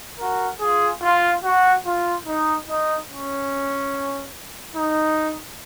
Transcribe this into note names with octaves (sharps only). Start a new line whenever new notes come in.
F#4 A#4
F4 G#4
F4
F#4
F4
D#4
D#4
C#4
D#4